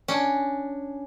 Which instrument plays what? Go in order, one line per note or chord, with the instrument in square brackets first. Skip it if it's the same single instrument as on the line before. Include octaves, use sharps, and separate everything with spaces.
[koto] C#4 D4